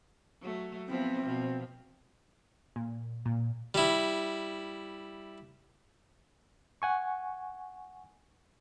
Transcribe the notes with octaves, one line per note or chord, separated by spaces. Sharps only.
F#3 A3
F3 B3 C4 E4
B2 F3
A#2
A#2
G3 E4
F#5 G#5 C#6